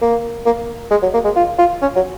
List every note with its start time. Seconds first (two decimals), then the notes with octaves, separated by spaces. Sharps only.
0.02 A#3
0.46 A#3
0.91 G#3
1.03 F#3
1.14 A#3
1.24 G#3
1.36 F4
1.58 F4
1.82 C#4
1.96 F#3